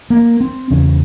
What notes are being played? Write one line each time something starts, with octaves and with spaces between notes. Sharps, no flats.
A#3
C4
E2 C#3 C#4